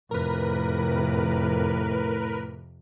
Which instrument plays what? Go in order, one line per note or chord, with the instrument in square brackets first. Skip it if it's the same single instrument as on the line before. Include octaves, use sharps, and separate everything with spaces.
[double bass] F2 C3 [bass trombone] A2 [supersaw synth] A#4 B4